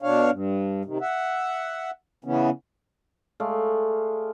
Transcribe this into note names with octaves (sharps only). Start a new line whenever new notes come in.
B2 D4 C#5 F5
G2
C3 D#3
E5 F#5
C#3 E3 B3 C#4
G#3 A3 D5 F5